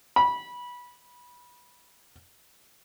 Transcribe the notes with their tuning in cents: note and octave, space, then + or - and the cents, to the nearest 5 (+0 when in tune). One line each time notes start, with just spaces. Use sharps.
B5 -20